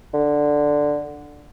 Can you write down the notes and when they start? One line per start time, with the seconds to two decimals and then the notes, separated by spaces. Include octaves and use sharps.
0.14 D3